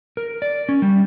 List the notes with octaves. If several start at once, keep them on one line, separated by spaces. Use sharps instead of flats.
A#4
D5
C#4
G3